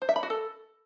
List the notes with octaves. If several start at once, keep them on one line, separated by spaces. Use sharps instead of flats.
C5
E5
B5
F#4
A4